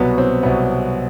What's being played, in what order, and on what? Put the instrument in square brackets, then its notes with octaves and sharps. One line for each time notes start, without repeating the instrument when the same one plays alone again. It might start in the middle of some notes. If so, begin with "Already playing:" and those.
Already playing: [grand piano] C2 B2 F#3 [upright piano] B3
[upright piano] C4
[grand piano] C2 B2 F#3 [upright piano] B3